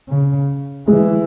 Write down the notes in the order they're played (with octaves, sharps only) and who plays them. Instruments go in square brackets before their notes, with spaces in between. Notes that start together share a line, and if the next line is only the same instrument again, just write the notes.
[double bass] C#3
[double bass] E3 [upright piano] G#3